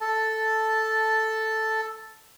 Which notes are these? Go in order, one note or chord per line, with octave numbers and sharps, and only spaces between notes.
A4 A5